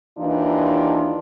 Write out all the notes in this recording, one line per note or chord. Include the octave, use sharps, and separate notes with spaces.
D#2 E3 D4 D#4 F4